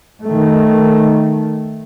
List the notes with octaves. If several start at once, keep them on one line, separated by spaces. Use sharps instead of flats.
D#3 A3